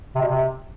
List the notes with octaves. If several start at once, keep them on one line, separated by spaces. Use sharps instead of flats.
C3
B2
C3